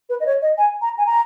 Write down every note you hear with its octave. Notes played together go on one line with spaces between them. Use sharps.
B4
D#5
C#5
D#5
G#5
A#5
G#5
A#5